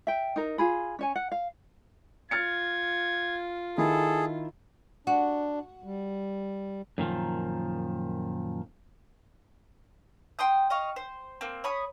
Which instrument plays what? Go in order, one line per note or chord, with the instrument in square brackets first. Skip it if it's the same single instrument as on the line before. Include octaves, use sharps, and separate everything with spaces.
[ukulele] E5 G5
D#4 A#4
F4 G#4 B5
C#4 C#5 G#5
F#5
F5
[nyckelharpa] F4 [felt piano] F6 A6 C#7 [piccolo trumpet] G#6
[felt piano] D#3 E4 [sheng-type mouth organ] G#4 [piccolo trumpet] A4
[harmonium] D4 [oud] F#4
[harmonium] G3
[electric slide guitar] F#2 A#2 D#3 F3
[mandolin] G5 C6 D#6 G6
D#5 F5 C#6
C5
A#3 C4
C#5 B5 D#6